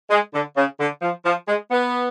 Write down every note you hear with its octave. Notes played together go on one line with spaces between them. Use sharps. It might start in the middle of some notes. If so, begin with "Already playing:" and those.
G#3
D3
C#3
D3
F3
F3
G#3
B3